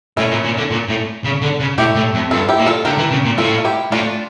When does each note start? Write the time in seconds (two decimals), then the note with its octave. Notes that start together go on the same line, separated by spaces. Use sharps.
0.17 A2 C#4 E4
0.31 A#2
0.44 A#2
0.57 D3
0.71 A#2
0.88 A2
1.24 C#3
1.42 D3
1.60 C#3
1.78 A2 E4 G4
1.96 A2
2.14 F2
2.31 G2 F4 A4
2.49 E4 G4
2.58 A#2
2.66 F4 A4
2.85 D3 G4 A#4
2.98 E3
3.12 C#3
3.25 A#2
3.38 A2 F4 A4
3.58 F4
3.65 E4 G4
3.92 A2 D4 F4